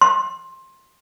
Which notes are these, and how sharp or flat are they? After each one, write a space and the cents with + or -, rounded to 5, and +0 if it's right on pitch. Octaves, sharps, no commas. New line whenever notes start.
C6 +20